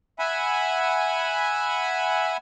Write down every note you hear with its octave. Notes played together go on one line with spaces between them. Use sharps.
E5 F#5 G#5 B5